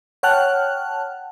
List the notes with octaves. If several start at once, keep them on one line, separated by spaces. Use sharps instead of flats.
C#5 F#5 G5 A5 F6 F#6